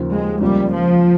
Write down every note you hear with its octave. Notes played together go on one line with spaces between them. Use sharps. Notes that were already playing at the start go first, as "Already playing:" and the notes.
Already playing: D#2 C#3 F3 A#3 F4
G#3
C#2 C#3 F3 G3 A#3 F4
F3